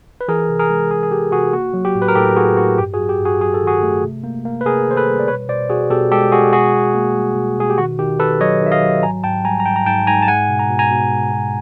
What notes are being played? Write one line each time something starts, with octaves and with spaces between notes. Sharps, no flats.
B4
E3 G#4 A#4
C3
G#4 A#4
G#3
E3 G#4 A#4
G#4
E3 G4 A4
C3 F#4 G#4
A#3 F#4
F#3
G4
A2
B4
A#4
A2 G4 A4
A2 F#4 G#4
A2 F#4
G2 G4
F#4 G#4
F#3
G4
G2
F#4 G#4
F#3 G#4
A4
D#3
F#4 G#4
A3
C3
A#3
A#3
B4
C3 G#4 A#4
D#3 C5
A4 B4
G3
D5
B2 B4 C#5
B2 C5 D5
B2 F#4 G#4
B2 G4 A4
G#3 G4 A4
G#3 F#4 G#4
B2 F#4 G#4
B2
A#3
G3
B2
B2 G#4
G4
D#3 F#4
D#3 G4
D#3 A4 B4
F#3 C#5 D#5
D#3 E5
D#5 F5
F#3
G#2 G#5 A#5
G#2 G5 A5
G3 G#5 A#5
A#5
G#2 G5 A5
A#5
G#2 G5 A5
G#2 G#5 A#5
A5
G#3 F#5 G#5
B2
A#5
B2
G#5 A#5
B2
G#3
B2